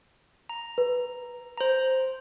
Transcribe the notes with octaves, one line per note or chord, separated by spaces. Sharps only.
A#5
B4
C5 A#5